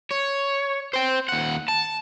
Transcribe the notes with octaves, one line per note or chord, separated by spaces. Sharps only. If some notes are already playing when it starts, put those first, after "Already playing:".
C#5
C5 G5
D#2 F#5
A5